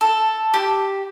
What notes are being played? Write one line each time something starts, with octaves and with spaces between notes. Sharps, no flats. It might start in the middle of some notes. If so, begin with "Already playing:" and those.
A4
G4